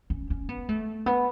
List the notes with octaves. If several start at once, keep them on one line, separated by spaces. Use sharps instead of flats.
C#4
C#4
B3
A3
B3